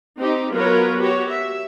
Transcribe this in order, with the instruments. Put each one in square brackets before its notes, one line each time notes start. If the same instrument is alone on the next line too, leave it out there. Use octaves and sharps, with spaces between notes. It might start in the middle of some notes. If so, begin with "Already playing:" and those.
[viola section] C4 D#4 G4
F#3 B3 F4 A#4 B4 C#5
F#4 G4 C#5
E5